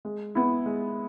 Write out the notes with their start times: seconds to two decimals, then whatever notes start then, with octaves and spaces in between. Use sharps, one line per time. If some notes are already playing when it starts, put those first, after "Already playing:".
0.05 G#3
0.35 B3 E4
0.66 G#3